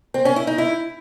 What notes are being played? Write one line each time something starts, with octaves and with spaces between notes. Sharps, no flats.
C4
C#4
E4
D#4
E4